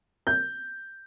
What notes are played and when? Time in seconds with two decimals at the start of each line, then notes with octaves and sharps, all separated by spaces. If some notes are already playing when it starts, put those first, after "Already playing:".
0.27 G6